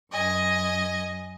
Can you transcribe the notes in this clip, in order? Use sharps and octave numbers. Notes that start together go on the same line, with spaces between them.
F#2 D#5 G#5